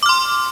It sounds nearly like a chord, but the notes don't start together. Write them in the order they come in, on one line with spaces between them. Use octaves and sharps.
D6 F6 C6